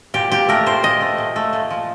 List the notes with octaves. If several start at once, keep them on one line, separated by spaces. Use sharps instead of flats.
A#2 G4
A#2 G4
A3 A#4
A#2 C5
A#2 D#5
A3
A#2
A3
A#2
F3